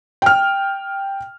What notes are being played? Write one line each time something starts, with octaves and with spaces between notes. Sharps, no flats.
G5 F6